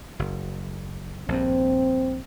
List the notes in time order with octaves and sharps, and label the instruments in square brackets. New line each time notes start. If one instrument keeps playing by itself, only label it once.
[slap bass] F#1
[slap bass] A#1 G2 [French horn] C4